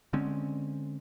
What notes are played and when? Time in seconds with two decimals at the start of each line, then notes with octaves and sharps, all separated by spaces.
0.13 D3 G#3 C4 C#4